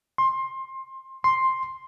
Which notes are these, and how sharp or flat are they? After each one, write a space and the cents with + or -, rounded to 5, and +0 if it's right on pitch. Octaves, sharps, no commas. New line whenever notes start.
C6 +20
C6 +5